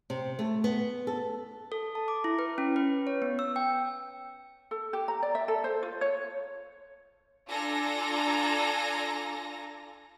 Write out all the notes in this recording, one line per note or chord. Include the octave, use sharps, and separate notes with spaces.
C3
A3
B3
A4
A4
A5
D6
E4
B4
C#4
B4
C#5
B3
E6
G5
A4
G4
A#5
D5
E5
A4
C5
F4
C#5
D4 F4 A4 G#5 A#5 A#6